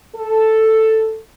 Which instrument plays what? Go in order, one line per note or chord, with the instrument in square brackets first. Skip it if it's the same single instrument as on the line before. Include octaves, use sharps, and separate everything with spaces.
[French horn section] A4